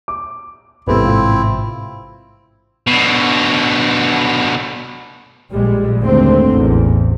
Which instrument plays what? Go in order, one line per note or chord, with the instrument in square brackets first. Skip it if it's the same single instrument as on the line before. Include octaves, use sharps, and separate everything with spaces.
[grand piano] D6
[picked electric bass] A1 G#2 C3 [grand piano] B3 G4 A4 [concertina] C4 E4
[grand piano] F4
[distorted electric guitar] B2 D3
[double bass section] A#1 G3 G#3
G#1 D#2 D3 A3 C4
A1 E2